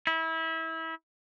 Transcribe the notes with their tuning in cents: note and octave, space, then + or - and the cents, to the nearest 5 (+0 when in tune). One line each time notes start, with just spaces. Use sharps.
E4 -25